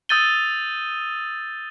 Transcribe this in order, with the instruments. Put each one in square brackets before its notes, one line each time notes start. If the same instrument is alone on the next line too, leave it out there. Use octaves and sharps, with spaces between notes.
[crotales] D#6 E6 G6 A6 D#7 G7